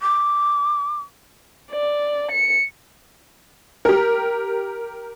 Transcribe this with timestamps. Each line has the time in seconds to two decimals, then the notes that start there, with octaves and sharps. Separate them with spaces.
0.02 D6
1.71 D5
2.31 C#7
3.85 G4 A#4